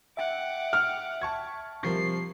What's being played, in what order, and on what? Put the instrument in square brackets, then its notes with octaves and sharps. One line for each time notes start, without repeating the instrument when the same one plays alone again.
[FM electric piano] E5 G5 [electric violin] F#5 D6
[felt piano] F6
[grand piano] A5 C#6 G#6
[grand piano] C3 F3 G3 [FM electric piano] A#4 C#6 [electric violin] C7